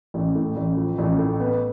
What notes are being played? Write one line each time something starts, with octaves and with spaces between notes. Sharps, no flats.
A1
A2
A1
F3
A1
A2
B3